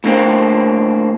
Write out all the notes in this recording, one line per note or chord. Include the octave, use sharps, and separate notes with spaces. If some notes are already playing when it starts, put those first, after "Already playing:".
A2 D3 A#3 C4